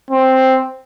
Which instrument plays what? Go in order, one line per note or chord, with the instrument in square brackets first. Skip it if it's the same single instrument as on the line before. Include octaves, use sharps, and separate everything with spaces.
[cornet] C4